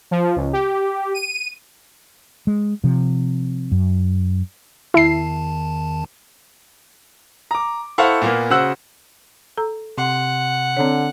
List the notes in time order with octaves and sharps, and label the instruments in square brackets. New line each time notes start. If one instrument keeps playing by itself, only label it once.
[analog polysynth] F3
C#2
G4
D#7
[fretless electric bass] G#3
C3 F3
F#2
[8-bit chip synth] E2 D#3 A5 [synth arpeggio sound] E4 C7
[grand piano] A#5 D6
E4 A4 C5 F5 F#5 C#6
A#2 A#3 B3
C#3 F#4 C5 F#5 E6 F#6
[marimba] A4 A#5 E6
[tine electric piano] C3 C6 [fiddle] F#5
[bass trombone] D3 [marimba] C4 C#5